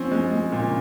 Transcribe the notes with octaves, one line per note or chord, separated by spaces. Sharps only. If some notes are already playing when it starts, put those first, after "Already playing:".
Already playing: F3 C4 C#4
G#3
G#3
A#2
C#3